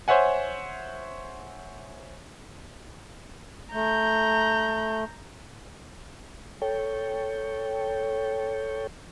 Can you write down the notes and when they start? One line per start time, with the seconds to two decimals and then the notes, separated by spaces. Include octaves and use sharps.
0.08 C5 C#5 E5 F#5 G#5
3.73 A3 A#5 G6
6.62 A4 C#5 G5